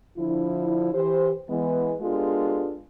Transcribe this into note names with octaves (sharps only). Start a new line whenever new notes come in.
D3 F3 E4
E3 G4 C5
E3 G#3 B3
G#3 B3 D4 F4 G4 A4